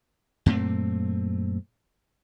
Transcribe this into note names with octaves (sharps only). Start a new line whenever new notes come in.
F#2 A#2 A3 C4